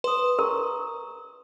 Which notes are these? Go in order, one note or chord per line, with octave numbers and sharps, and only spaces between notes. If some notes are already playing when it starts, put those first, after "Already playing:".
B4 C6 D#6
A#4 A#5 C#6